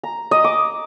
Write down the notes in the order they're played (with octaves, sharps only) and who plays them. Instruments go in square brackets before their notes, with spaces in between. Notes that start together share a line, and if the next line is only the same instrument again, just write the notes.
[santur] A#5
D#5
D6